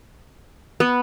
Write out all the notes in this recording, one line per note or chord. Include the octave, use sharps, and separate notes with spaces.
B3